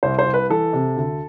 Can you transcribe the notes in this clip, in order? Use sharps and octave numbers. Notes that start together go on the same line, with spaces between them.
C2 C5
C5
C2
B4
E3 A4
C3
D2